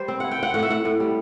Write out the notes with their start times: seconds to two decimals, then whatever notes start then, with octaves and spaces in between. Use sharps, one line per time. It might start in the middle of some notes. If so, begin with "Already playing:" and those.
Already playing: G3 C5
0.08 C4
0.20 E4 F#5
0.31 G5
0.39 C4 F#5
0.54 A2 F#5
0.63 E5
0.69 A2 F#5
0.85 A2
1.00 G3